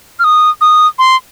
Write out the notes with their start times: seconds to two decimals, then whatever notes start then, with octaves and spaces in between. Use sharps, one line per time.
0.19 F6
0.24 D#6
0.61 D#6
0.99 C6